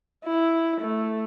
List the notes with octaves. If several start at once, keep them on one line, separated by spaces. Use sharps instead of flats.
E4
A3